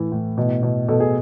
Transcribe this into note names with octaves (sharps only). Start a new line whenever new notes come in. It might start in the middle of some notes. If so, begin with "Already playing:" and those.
Already playing: A2 E3
A2
B2
B2
B2 A4
G#4